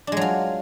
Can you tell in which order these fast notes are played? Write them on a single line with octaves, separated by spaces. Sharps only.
D4 G#3 F#3 F4